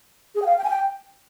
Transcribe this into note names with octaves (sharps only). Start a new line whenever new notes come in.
G#4
G5
F5
G5
G#5
G5